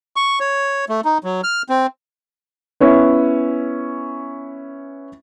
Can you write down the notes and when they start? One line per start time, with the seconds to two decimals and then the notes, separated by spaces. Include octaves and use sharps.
0.16 C#6
0.40 C#5
0.89 A3
1.05 D#4
1.24 F#3
1.44 F6
1.69 C4
2.80 B3 C#4 E4